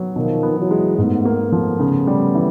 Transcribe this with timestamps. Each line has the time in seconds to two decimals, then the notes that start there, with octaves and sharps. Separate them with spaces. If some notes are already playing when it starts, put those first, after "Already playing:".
Already playing: F#3 B3
0.15 B2 D#3 F3
0.43 B3
0.57 E3 F#3
0.71 G#3
0.98 G#2 A3 B3
1.25 A#3
1.39 A3 B3
1.52 F3
1.79 C#3
2.07 G3
2.35 E3